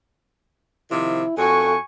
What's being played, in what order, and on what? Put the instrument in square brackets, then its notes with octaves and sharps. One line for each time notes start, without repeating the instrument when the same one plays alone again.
[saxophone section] C3 D#3 F3 [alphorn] E4
[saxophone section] F2 F#4 [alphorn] A4 [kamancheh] G#5 C#6